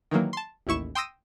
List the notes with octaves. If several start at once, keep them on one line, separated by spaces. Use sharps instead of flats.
D#3 E3 F#3 A#3
A5 C6
A1 D#2 E4 C#6 E7
G5 C6 D#6 E6 A#6 D#7